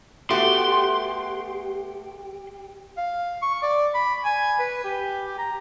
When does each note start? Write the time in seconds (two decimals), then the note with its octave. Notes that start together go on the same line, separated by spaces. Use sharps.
0.31 A3 B3 F#4 G4 C6
2.97 F5
3.42 C#6
3.63 D5
3.94 B5
4.25 G#5
4.59 B4
4.84 G4
5.26 G4
5.38 A#5